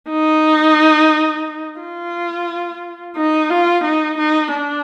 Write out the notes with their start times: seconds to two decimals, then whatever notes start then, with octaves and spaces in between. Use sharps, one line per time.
0.10 D#4
1.80 F4
3.17 D#4
3.50 F4
3.84 D#4
4.18 D#4
4.53 D4